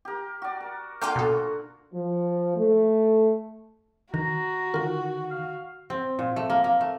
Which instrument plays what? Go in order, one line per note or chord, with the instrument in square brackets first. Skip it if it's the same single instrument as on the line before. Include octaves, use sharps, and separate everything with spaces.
[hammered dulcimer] G4 A#4
F#4 D5
A#4
[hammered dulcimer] D3 F#4 [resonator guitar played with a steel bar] A#3 F4 G#5 [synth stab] G5 D6 G6
[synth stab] B2 A4
[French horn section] F3
A3
[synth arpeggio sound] D#3 [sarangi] F#4 [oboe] A#5
[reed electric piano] D3 D#3 [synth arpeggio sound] F4 A#4
[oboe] F5
[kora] C4
A#2
A3
A#3
A#3
A3